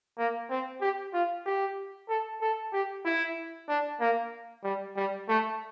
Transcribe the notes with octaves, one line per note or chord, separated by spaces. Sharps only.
A#3
C4
G4
F4
G4
A4
A4
G4
E4
D4
A#3
G3
G3
A3